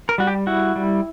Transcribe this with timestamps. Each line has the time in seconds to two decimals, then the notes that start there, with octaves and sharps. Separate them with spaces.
0.09 A#4
0.18 G3 F#4
0.27 G4
0.47 E4 F#4
0.76 G3